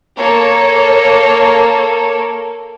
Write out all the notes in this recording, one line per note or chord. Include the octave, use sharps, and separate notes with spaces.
A#3 A4 C#5